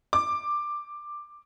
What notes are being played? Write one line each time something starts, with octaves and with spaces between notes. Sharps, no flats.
D6